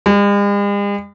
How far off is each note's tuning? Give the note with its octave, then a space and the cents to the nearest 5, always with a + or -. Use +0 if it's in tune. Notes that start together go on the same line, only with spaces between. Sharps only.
G#3 -45